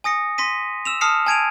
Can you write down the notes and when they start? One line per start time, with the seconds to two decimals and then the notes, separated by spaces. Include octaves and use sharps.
0.04 G#5 D#6 A#6 C#7
0.38 C6 A#6 B6 D#7
0.85 E6 E7 F7
1.01 A5 D#6 F6 C7 C#7 F7
1.26 G#5 A5 G#6 D7 D#7 F7